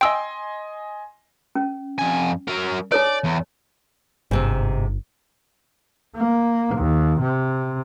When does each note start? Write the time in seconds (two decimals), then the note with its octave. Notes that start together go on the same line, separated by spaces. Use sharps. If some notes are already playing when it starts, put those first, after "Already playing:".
0.01 D#5 G5 G#5 C6 E6
1.55 C#4
1.98 F2 G#5
2.48 F#3 A#4
2.92 D#4 A4 C#5 D5
3.24 E2
4.31 G1 G#2 C3 C4
6.17 A#3
6.75 D#2
7.21 C3